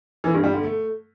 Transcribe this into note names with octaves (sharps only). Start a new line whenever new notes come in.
E3
G2
G3
D3
A3